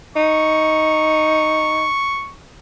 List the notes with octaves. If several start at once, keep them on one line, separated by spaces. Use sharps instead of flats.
D#4 C#6